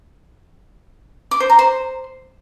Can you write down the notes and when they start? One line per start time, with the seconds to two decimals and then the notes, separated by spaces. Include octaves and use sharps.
1.31 D6
1.40 C5
1.50 A#5
1.59 C5